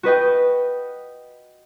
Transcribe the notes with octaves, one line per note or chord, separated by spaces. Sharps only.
F#4 B4 D#5 G5